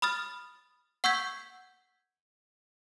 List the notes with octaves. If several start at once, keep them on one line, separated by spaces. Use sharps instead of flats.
B5 D#6 F6 A6
F#5 C#6 E6 G6 G#6 B6